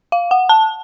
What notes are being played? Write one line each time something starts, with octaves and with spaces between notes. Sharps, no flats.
F5
F#5
A5